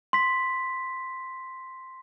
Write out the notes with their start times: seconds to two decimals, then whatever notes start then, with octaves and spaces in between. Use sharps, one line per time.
0.13 C6 B6